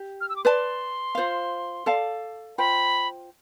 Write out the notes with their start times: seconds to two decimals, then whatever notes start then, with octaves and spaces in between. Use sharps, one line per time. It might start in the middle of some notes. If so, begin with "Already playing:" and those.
Already playing: G4
0.21 F6
0.29 E6
0.36 D6
0.45 B4 D5 A5 C6
1.15 F4 C5 F5
1.86 A4 D5 F5 A5
2.58 F4 C5 G5 B5